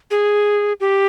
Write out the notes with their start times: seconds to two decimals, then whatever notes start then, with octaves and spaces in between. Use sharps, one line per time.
0.11 G#4
0.80 G4